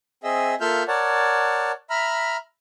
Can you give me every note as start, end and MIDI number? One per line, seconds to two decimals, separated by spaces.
0.24 0.55 60
0.24 0.55 68
0.24 0.55 75
0.24 0.55 76
0.61 0.83 58
0.61 0.83 65
0.61 0.83 69
0.61 0.83 76
0.61 0.83 89
0.61 0.83 91
0.88 1.72 70
0.88 1.72 73
0.88 1.72 74
0.88 1.72 78
0.88 1.72 81
1.90 2.37 76
1.90 2.37 82
1.90 2.37 83
1.90 2.37 89